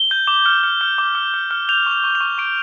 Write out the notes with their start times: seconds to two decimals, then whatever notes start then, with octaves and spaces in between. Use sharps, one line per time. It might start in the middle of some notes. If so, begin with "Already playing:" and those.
Already playing: G7
0.11 G6
0.27 D6
0.46 F6
0.64 F6
0.81 F6
0.98 D6
1.15 F6
1.34 F6
1.51 F6
1.69 G6 F7
1.86 C#6 F7
2.04 C#6
2.15 F7
2.21 C#6
2.38 C#6 D7